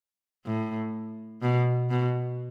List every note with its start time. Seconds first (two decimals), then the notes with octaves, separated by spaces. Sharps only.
0.46 A2
1.42 B2
1.90 B2